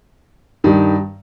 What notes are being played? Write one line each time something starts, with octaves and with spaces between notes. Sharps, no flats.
G2 D#3 G3